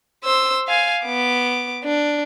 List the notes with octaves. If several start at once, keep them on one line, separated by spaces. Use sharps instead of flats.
C5 E6
F5 G#5
B3 D6
D4